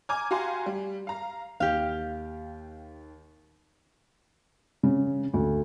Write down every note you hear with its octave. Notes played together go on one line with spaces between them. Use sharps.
G#5 A#5 D6 F6 G#6
F#4 G4 F5 G#5 A#5 C6
G3
F5 A#5
D#2 G4 F5
C#3
D2